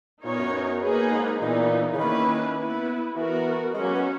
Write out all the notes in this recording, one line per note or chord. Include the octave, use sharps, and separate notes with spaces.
A#2 B3 D#4 A#4 C#5
F#2
A#3 D#4 G#4 B4
G#2
A#2 E3 B3 D#4
C#3
D#3 A#3 C#4 E4 B4
B3 E4 B4
E3 B3 F#4 A#4
F#3 G#3 C#4 F#4
A#3
B3